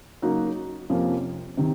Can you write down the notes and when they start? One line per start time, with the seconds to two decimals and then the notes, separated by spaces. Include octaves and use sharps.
0.22 C#3 F#3 A#3 D#4 F#4
0.90 F2 C3 F3 A#3 C#4
1.57 C3 D#3